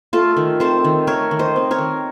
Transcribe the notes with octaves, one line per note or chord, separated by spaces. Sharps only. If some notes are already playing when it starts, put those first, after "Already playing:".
A3 F4 A4
D#3
C4 A4 C5
D#3
A3 A#4 C#5
D#3
C5 D#5
C4
A#4 C#5
D#3